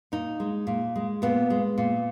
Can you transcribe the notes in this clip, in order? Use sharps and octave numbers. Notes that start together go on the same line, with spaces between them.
A#2 D#4
G#3
A#2
G#3
A#2 B3
G#3
A#2